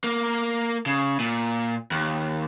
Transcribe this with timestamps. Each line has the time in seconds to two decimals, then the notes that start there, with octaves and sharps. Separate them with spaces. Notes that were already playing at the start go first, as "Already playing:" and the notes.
0.04 A#3
0.86 C#3
1.19 A#2
1.91 D#2